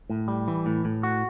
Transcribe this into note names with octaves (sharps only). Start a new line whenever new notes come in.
A2
G3
E3
A2
A2
F#4